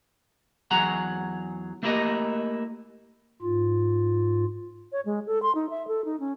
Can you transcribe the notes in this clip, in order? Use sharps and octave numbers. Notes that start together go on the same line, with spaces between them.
E2 F#3 G#4 F#5 A#5
A3 A#3 E4 G4 A#4 D#5
G#2 F4
C#5
G#3
A4
C6
D#4
E5
A4
D#4
C#4